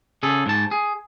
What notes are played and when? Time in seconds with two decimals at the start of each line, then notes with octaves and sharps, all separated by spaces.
0.23 C#3 G#4 A4
0.46 G#2 A5
0.71 G#4